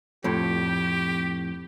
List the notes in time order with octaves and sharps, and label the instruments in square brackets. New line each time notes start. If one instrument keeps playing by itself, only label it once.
[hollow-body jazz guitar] F2 A2 [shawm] G4